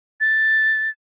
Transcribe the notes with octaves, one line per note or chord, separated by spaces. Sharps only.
A6